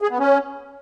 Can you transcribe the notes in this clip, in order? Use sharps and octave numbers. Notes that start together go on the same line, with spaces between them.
G#4
B3
C#4